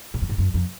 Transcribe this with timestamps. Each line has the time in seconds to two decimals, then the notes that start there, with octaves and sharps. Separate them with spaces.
0.14 G#2
0.22 F#2
0.29 G#2
0.38 F#2
0.54 F2